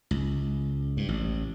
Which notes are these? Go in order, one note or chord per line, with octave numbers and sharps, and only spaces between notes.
C#2
G2
A1